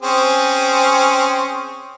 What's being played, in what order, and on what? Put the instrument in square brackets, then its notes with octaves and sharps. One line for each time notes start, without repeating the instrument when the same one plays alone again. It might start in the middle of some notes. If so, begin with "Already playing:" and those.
[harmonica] C4 C#4 G#4